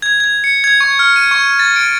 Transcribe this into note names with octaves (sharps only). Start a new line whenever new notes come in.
G#6
G#6
C#7
G#6
C#6
F6
D#7
C#6
A6
D7